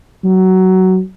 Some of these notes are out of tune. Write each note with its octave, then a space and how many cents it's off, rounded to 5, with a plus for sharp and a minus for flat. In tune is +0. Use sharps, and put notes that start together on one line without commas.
F#3 +15